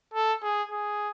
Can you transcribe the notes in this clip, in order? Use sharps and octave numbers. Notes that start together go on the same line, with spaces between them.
A4
G#4
G#4